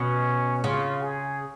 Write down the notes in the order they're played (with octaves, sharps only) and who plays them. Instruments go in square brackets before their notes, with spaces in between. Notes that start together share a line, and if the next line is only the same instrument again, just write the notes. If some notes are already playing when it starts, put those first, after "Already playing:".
Already playing: [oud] B2 [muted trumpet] C#4
[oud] C#3 [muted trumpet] F4
[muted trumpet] G#4